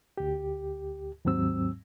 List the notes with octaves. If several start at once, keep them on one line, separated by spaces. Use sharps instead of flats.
D2 G4
D#2 G#2 F#3 C4 E6